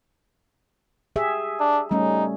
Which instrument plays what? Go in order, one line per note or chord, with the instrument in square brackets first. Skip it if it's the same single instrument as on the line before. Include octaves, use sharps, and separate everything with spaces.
[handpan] G4 G#4 E5
[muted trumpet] D4
[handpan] G3 A3 C#4 [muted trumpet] D#4